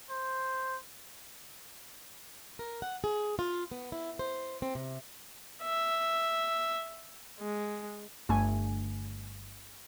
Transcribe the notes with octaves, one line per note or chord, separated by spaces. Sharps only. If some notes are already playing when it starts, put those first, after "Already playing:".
C5
A#4
F#5
G#4
F4
B3
E4
C5
C4
C3
E5
G#3
G1 G2 A3 G#5